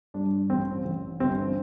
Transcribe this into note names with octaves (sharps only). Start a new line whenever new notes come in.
G2 D4
A1 C4
A1
G1 C4